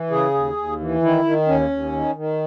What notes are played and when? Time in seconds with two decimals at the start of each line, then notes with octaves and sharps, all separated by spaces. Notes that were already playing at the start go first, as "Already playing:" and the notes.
Already playing: E3
0.10 C#3 G#4
0.34 D#2
0.57 D#2
0.80 E3
1.01 D#3 E4
1.25 D#3
1.47 D#2 C#4
1.70 D#2
1.92 D#3
2.16 D#3